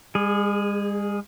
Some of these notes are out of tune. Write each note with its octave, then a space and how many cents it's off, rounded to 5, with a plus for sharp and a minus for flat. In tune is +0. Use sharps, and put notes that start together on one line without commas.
G#3 -45 G#4 +0